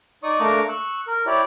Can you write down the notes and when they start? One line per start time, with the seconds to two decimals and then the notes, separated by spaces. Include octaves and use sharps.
0.23 D#4 D5 C#6 D#6
0.40 A3 A#3 D4 A#5 C#6 D6
0.69 C#6 E6 F#6
1.07 A#4
1.26 E4 G4 C#5 D5